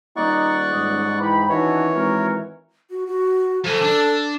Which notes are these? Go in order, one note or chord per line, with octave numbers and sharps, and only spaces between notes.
D#1 D#4 D5 F#5 C#6
G#2 C#4 D#5
E3 G5 B5
D#3 E3 C#4 D4 F#4 C#5
G#1 F#4 A#4
F#4
F#4
F3 A4 G#5
D4